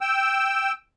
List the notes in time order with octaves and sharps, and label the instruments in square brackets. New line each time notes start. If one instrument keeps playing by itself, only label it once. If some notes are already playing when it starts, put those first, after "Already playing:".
[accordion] G5 E6